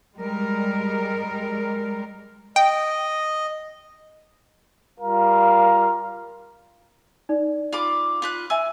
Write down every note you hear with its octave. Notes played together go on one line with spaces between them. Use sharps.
G3 G#3 A#4
D#5 G5
G3 F4 A#4 F5 A#5
D#4 D5
F4 B5 D6
F4 B4 F#6
E5 G#5 E6